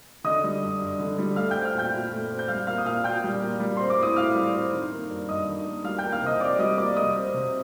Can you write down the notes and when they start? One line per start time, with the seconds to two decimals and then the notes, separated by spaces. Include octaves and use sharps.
0.24 D3 D#5 D#6
0.44 G3
0.62 G2
0.81 G2
0.99 D3
1.18 G3
1.36 A3 F5 F6
1.51 G5 G6
1.55 C4
1.65 F5 F6
1.74 A#2 G5 G6
1.93 A#2
2.12 A3
2.30 C4
2.39 G6
2.48 G3 F5 F6
2.67 A#3 F5 F6
2.78 D#6
2.86 A#2 F5 F6
3.04 A#2 G5 G6
3.24 G3
3.41 A#3
3.60 G3
3.77 C4 C6
3.90 D6
3.98 A2 D#6
4.16 A2 F5 F6
4.35 G3
4.54 C4
4.72 D#3
4.91 A#3
5.10 G2
5.29 G2 D#5 D#6
5.48 D#3
5.66 A#3
5.84 G3 F5 F6
5.98 G5 G6
6.04 A#3
6.12 F5 F6
6.22 C3 D#5 D#6
6.40 C3 D5 D6
6.59 G3 D#5 D#6
6.77 A#3 D5 D6
6.96 G3 D#5 D#6
7.15 C4
7.34 C3